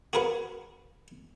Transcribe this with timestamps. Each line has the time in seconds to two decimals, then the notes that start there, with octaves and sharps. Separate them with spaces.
0.13 F#4 G#4 A#4 B4 F#5